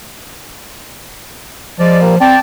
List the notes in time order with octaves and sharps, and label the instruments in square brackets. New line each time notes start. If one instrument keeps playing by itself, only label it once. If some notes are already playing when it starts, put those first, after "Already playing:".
[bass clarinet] F3 [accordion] G#3 D5
[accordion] A#2 G3 A#3
[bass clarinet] C4 [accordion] D5 G5 A5